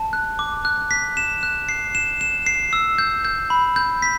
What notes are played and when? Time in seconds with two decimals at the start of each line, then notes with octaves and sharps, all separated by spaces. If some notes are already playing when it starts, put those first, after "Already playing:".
Already playing: A5
0.13 F#6
0.39 D6
0.65 F#6
0.91 B6
1.17 E7
1.43 F#6
1.69 C7
1.95 E7
2.21 E7
2.46 C7
2.73 E6
2.98 G6
3.25 G6
3.50 B5
3.76 G6
4.02 B6